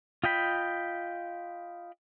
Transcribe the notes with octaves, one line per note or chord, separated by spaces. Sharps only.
F4 D#5 G5 B5